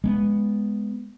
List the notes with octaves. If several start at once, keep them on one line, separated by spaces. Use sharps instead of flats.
G#3 A#3 B3